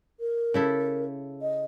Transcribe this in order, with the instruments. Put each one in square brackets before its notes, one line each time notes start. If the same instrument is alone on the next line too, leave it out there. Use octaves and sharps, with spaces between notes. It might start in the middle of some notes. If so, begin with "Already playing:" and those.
[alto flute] A#4
[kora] C#3 E4 A4
[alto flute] D#5